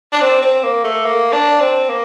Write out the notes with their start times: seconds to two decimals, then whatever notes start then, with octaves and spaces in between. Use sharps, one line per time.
0.13 D4
0.21 C4
0.42 C4
0.63 A#3
0.84 A3
1.05 A#3
1.33 D4
1.60 C4
1.89 A#3